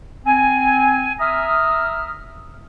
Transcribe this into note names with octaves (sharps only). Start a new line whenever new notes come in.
C4 G#5
E5 A#5 D#6 F6